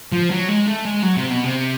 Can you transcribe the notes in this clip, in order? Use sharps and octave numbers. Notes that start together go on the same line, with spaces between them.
F3
F#3
G#3
A3
G#3
F#3
C3
B2
C3